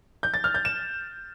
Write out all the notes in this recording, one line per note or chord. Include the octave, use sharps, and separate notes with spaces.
G6
A6
F6
G6
E7